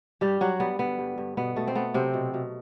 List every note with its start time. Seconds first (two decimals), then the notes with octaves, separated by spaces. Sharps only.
0.21 G2 G3 G4
0.41 G2 F#3 F#4
0.60 G3 B3
0.79 D3 B3
0.99 G2
1.18 G2
1.37 B2 B3
1.56 B2 A3
1.68 C4
1.75 A3 B3
1.94 C3 F#3 C4
2.14 B2
2.34 B2